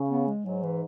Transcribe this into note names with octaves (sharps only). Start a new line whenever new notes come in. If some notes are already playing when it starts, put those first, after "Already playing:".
Already playing: C#3
B3
G#3
G#2 F#3
E3